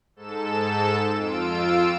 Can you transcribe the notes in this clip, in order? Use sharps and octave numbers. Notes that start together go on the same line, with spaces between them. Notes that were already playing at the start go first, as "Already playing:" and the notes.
G#2 A4 E7
F2 F4 E6 D7